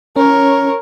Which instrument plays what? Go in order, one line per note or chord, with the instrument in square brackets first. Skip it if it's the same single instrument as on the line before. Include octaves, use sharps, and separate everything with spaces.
[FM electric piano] C#4 [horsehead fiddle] A#4 C#5